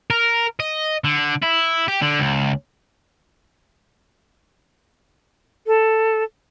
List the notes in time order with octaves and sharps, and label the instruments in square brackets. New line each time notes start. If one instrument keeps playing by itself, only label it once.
[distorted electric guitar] A#4
D#5
D3
E4
G4
D3
C#2
[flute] A4